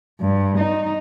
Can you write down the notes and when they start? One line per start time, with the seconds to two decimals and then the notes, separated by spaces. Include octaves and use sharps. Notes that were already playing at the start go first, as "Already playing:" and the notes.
0.20 G2
0.58 D#4